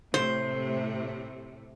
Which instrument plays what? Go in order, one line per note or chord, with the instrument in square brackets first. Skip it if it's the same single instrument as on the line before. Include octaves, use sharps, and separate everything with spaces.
[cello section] A2 C3 A3 [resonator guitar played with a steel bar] C5